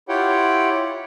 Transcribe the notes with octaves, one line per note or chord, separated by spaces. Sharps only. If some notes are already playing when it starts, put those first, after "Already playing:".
E4 F4 G4 C#5 F#5 G5